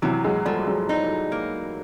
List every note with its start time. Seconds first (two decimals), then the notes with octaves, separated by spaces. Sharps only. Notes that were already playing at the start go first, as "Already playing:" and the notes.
0.02 C3 E3 F#3
0.24 F#3 G#3
0.45 F3 G3 A3
0.67 F#3 G#3
0.89 D#4
1.32 A#3